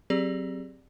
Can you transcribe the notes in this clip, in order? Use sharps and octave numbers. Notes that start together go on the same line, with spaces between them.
F#3 C4 G4 G#4 D5